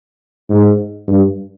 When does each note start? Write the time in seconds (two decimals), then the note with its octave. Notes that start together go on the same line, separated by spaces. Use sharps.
0.50 G#2
1.08 G2